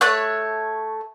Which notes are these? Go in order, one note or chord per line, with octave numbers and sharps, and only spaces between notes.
A3 C#5 F#6